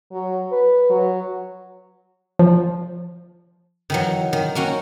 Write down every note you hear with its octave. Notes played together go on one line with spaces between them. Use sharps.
F#3
B4
F#3
F3
D#3 E3 F#3
D#3
A#3 C#4 F#4